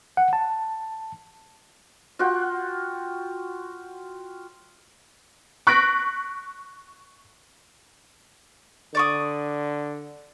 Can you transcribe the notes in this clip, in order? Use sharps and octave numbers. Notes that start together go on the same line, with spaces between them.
F#5
A5
F4 F#4 F#5 G5
C#6 F#6 A#6 B6 D7
D3 D5 C#6 D#6